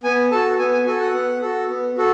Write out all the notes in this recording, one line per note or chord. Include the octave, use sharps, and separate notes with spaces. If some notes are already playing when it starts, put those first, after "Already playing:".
B3 G#5
F#4 A4 A5
B3 G#5
G#5
F#4 A4 G#5
F#5
B3
F#4 A4
B3
F#4 A4